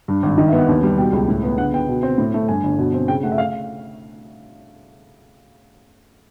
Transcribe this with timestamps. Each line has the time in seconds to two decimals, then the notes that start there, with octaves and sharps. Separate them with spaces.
0.08 G2
0.23 G#1
0.38 D#3 D#5
0.48 E5
0.52 B3
0.58 F#5
0.69 D#2
0.83 G3
0.98 B2 G5
1.13 C#2
1.28 A2
1.43 B3
1.58 D3 F#5
1.73 B3 G5
1.89 B2
2.03 C4
2.18 A2
2.34 A3
2.48 G2 G#5
2.63 G1
2.78 B2
2.94 C4
3.08 C#3 G5
3.23 A3 F#5
3.32 E5
3.38 F5